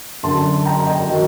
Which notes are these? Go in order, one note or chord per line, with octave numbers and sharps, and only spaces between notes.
F#2 D3 F#3 A5 C6
G5 A#5
D#5 G5
D#3 F#3